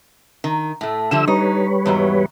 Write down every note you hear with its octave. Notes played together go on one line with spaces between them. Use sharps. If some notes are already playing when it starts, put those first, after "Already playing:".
D#3
A2 A3
D3 F3 G3 E5 E6
G3 D#4 B4 C#5
E2 G#2 F#3